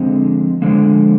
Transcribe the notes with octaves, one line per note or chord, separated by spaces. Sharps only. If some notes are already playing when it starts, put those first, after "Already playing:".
Already playing: D3 F3 G#3 C4
D3 F3 G#3 A#3